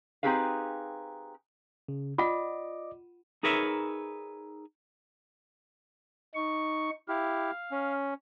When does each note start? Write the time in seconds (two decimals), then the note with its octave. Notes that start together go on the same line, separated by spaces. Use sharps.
0.23 C4 D#4 G4 G#4 B4 F5
1.88 C#3
2.18 F4 D5 D#5 F#5 D6
3.43 D#4 G#4 A#4 B4 C#5 E5
6.35 D#4 C#6
7.08 E4 G4 F5
7.72 C#4